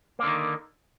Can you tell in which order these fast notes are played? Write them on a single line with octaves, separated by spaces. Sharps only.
A#3 D3 D#3